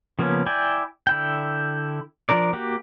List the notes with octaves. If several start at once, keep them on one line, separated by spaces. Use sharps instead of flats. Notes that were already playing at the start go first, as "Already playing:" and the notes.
C#3 F3 A#3 B3 C#4
E4 D5 G5 G#5
D3 E4 G5
F3 D4 A#4 D5
A#3 F#4 G4